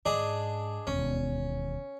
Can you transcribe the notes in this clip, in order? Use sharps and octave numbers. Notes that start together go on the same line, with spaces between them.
G#2 D4 G#4 D#5
E1 D#2 C#4